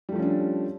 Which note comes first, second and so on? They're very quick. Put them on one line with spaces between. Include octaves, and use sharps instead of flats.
G3 A3 F3 C#4 D4